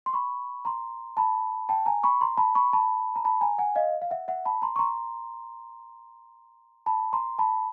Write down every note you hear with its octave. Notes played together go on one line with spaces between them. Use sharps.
C6
B5 C#6
A#5 C6
A5 B5
G5 A5
G#5 A#5
B5 C#6
A#5 C6
A5 B5
B5 C#6
A5 B5
A#5
A5 B5
G#5 A#5
F#5 G#5
D#5 F5
F5
E5 F#5
E5 F#5
A5 B5
A#5 C6
C#6
A#5 C6
A5 B5
A#5 C6
A5 B5